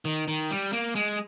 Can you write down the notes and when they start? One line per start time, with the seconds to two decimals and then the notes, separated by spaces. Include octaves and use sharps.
0.05 D#3
0.28 D#3
0.51 G3
0.73 A#3
0.95 G#3